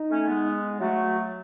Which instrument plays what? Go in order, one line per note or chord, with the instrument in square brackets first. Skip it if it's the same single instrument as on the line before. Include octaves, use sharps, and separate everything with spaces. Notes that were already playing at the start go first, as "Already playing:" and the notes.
Already playing: [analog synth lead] D#4
[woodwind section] A3 C#4
G#3 B3
[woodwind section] F#3 A3 [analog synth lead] F#4